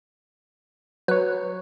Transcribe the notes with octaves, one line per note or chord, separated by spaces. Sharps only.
F#3 B4 C#5